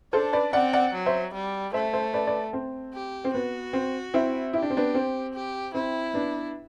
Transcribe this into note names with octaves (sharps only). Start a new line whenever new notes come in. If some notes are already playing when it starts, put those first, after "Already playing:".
D4 A4 C5
B4 D5
C4 D5 F#5
D5 F#5
F#3
C5 E5
G3
A3 C5 E5
C5 E5
B4 D5
B4 D5
C4
G4
C4
B3 F#4
C4
C4 E4
E4 G4
D4
C4
B3 D4
C4
G4
C4 E4
B3 D4